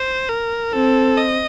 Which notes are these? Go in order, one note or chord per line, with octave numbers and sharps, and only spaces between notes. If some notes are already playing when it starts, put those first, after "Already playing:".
Already playing: C5
A#4
C4 A4
D#5